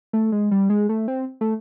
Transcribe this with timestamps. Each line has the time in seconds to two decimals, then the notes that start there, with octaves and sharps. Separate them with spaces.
0.13 A3
0.32 G#3
0.51 G3
0.70 G#3
0.89 A3
1.08 C4
1.41 A3